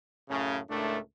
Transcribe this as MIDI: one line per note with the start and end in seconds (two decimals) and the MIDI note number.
0.29 0.59 42
0.29 0.59 45
0.29 0.59 49
0.70 0.98 37
0.70 0.98 45
0.70 0.98 57
0.70 0.98 62
0.70 0.98 70